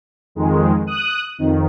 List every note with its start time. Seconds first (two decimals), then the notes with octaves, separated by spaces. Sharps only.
0.35 F2 D#3 G#3
0.87 D#6 F#6
1.38 F2 D#3